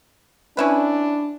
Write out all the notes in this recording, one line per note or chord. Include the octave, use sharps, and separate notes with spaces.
C#4 D4 E4 B4